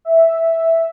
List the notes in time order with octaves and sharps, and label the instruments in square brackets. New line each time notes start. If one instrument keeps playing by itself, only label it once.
[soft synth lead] E5